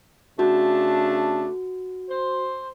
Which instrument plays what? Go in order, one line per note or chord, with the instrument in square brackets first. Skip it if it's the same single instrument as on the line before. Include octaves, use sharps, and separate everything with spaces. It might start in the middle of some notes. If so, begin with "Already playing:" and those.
[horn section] C#3 A3 D4 [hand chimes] F#4
[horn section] C5